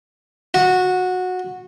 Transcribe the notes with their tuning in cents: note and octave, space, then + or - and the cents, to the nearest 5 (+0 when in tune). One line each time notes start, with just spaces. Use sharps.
F#4 -15